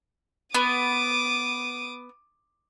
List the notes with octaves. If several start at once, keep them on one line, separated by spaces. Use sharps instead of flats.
B3 D6 D#6